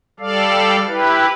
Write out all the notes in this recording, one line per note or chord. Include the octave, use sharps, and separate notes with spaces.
G3 A4 D5 F5
E4 G4 B4